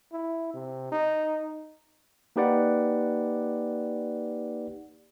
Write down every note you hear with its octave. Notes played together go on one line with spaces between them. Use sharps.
E4
C3
D#4
A#3 D#4 G4 B4 D5 F#5